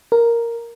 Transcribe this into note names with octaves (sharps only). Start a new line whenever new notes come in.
A#4